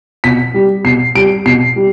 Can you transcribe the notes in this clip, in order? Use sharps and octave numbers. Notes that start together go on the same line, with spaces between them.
B2 B6
G3
B2 C7
G3 D7
B2 C7
G3